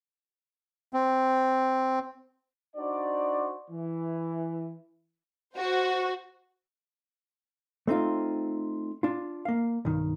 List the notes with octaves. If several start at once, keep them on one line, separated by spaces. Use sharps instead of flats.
C4
D4 D#4 F#4 C5 D5
E3
F#4 C5
A3 C4 D#4 F4
D4 F4
A#3 F5
B1 G2 D#3